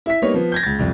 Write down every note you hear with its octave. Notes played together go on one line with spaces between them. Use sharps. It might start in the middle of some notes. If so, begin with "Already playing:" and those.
E4 E5 B6
G3 A#3 B3 D#4 C#5
F3 B3
G6 G#6 A#6
C#2 A6
C2 F2